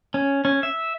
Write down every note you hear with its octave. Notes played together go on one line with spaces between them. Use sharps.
C#4
C#4
E5